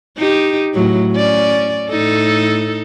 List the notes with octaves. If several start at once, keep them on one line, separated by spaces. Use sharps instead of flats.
D#4 G4
A2 F#3
C#4 D5
A2 D#4 A4